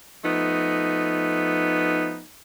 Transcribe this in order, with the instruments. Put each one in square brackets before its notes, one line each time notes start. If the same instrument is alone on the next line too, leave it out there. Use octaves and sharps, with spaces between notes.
[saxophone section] F3 A3 B3 D#4